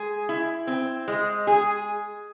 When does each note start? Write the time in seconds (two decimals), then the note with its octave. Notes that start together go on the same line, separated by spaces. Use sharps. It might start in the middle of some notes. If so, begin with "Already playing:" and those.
Already playing: G#3 G#4
0.29 E4
0.67 C4
1.08 G#3
1.47 G#4